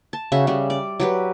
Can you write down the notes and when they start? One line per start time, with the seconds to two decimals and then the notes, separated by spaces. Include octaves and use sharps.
0.13 A5
0.32 C#3 F#4 E5
0.47 C#3 G3
0.70 D5
1.00 F#3 G4 B4